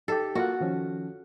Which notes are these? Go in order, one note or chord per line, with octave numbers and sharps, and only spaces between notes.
D#4 G4 A4
A#3 F4 F#4 F#5
D#3 F3 C#4